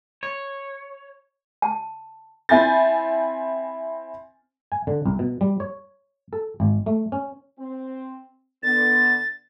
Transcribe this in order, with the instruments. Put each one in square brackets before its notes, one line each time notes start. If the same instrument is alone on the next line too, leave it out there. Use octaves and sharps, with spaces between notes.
[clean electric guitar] C#5
[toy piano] A5
[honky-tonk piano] C4 E4 G#5 G6 A6
[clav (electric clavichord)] G#5
D3
C2
B2
G3
C#5
A4
G#1
A3
C#4
[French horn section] C4
[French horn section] D3 B3 [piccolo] A6